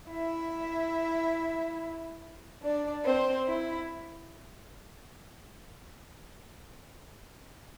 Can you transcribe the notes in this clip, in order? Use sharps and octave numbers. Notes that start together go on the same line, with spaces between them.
E4 E5
D4 D5
C4 C5
E4